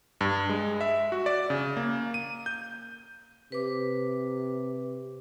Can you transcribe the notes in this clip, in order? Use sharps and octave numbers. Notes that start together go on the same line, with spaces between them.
G2
G#3
E5
F#4
D5
C#3
A#3
D#7
G6
C3 B4 D6